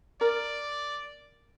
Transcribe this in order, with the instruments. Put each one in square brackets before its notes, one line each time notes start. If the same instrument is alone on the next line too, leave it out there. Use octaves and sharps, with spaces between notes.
[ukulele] A#4 [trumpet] D5